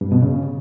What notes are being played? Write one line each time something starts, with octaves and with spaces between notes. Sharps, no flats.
G2
B2
C#3